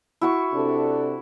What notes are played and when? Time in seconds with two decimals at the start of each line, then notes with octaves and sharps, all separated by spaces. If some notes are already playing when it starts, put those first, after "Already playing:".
0.21 E4 F#4 C#6
0.53 C3 D4 A4